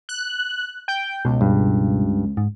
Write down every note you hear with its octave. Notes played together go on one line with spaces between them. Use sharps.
F#6
G5 G6
C#2 B2
G2
G#2